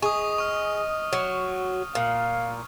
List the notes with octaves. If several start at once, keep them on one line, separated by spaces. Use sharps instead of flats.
G#4 D#5 C#6 D#6
C#6 F6
F#3
A#2 F5